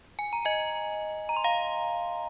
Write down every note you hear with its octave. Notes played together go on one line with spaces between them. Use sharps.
G#5
A#5
D#5 G#5
A#5
C6
F5 A#5